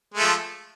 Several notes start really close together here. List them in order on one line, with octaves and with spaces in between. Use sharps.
G#3 A3 F3